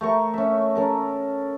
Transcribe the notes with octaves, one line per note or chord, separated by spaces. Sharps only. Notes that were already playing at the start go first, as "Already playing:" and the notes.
A3 A#4 C#6
C#4 E5
C#4 A4 A#4